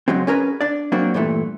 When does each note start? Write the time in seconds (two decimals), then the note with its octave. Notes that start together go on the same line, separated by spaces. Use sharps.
0.08 C#2 F#2 F#3 G#3 C4
0.27 C#4 G#4 A#4 B4
0.61 D4 D5
0.92 F#3 A#3 C4 D4 F#4
1.14 G2 A#2 E3 A3